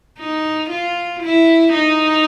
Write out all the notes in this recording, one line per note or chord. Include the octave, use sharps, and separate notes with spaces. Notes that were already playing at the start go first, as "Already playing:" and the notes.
D#4
F4
E4
D#4